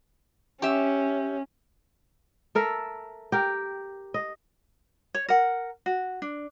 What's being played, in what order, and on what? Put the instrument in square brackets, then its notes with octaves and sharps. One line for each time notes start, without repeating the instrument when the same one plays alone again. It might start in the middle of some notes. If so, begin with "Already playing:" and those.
[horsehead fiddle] C#4 [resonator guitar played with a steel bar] G4 E5
[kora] A4 A#4 E5
G4 A#4
D#5
[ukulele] C#5
A#4 F#5
F#4
D4